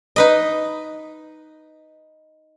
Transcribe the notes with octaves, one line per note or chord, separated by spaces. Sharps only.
D#4 B4 D#5